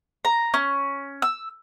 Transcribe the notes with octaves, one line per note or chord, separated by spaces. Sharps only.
A#5
C#4
E6